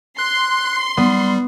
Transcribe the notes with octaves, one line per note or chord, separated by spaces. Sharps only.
C6 F#6
G3 B3